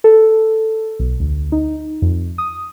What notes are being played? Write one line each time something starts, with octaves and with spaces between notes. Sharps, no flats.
A4
B1
D2
D#4
F2
D#6